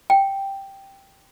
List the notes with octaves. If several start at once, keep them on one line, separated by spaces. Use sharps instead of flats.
G5